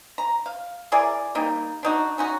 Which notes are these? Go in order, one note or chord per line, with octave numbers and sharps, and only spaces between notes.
A#5
F5
E4 G#4 A#4 D5
G3 A#3 D#4
D4 D#4 F#4
C#4 D#4 F#4